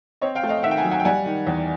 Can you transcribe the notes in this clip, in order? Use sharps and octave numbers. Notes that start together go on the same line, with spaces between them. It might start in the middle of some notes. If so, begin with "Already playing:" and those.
C4 C#5 D#5
F5 G5
A3
D#5 F5
D#3 E5 F#5
G5
F#5 G#5
F#3
F#5 G#5
G5
G3 F#5 G#5
D#3
E2